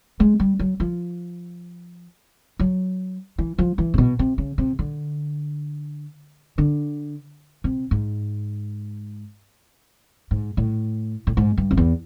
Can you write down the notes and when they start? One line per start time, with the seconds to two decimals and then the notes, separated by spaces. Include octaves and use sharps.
0.20 G#3
0.40 G3
0.59 F#3
0.80 F3
2.59 F#3
3.38 E3
3.59 F3
3.78 E3
3.94 C3
3.98 B2
4.19 C3
4.38 C#3
4.58 C3
4.79 D3
6.58 D3
7.64 C3
7.91 G#2
10.31 G#2
10.57 A2
11.27 A2
11.37 G#2
11.58 G2
11.71 F2
11.77 E2